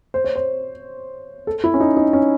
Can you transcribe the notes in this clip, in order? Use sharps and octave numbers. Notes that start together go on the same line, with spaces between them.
C5
C#5
C5
A4
E4
C#4
D#4
D#4
C#4